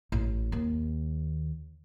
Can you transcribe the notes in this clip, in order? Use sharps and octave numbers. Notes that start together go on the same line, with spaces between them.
A1
D#2